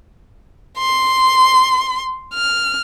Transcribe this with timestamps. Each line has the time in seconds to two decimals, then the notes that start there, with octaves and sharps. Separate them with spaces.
0.78 C6
2.34 F6